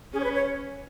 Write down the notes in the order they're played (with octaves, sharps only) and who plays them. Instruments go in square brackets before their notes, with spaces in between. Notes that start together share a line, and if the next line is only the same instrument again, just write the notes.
[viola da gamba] C#4 [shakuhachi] G#4
[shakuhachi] C#5
B4
C#5